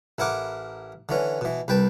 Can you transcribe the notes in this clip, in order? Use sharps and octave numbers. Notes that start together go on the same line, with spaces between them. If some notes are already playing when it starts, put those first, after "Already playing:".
A1 E4 A#4 F#5 D6
D3 E3 C#4
B2 E3
C2 B4 G5 A5